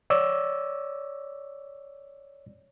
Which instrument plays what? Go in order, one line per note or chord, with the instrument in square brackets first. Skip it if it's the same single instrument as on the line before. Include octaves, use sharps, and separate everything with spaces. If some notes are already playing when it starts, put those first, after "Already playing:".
[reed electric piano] C#5 D5 E6